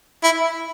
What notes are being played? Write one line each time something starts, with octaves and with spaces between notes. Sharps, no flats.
E4